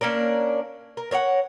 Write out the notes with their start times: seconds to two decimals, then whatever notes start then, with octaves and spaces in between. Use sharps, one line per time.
0.01 A#3 C#4 D4 A#4
0.97 A#4
1.11 A#4 C#5 D5 F#5